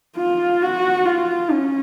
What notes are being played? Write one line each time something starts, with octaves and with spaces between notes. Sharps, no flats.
F4
F#4
F4
C#4